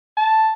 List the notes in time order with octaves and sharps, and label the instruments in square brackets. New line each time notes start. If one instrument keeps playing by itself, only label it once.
[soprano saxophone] A5